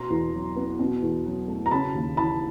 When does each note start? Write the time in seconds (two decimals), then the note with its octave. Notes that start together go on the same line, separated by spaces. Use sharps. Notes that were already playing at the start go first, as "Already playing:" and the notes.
Already playing: B2 B3 A#5 C6
0.10 E2
0.34 F#3
0.56 B3
0.79 B2
1.02 E2
1.26 F#3
1.48 A3
1.66 A#5
1.71 C#3 A5 B5
1.94 D#2
2.17 E3 A5 B5